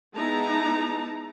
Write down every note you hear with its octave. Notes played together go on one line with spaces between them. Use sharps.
G#3 B3 D#4 E4 A5 A#5